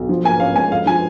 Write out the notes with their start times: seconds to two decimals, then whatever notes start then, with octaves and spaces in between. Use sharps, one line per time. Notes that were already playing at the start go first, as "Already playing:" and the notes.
Already playing: B1
0.09 F3
0.24 A#3 G#5
0.40 C#4 F5
0.56 G#2 G#5
0.72 F2 F5
0.86 F3 G#5